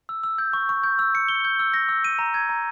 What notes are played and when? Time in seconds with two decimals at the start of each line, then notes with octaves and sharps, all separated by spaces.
0.09 E6
0.23 E6
0.38 G6
0.53 C#6
0.69 C#6
0.83 G6
0.99 E6
1.15 C#7
1.29 G7
1.45 G6
1.59 E6
1.74 A#6
1.89 E6
2.05 D#7
2.19 A#5
2.34 G#6
2.49 A#5